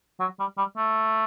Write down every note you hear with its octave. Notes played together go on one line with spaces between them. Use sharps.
F#3
G3
G3
A3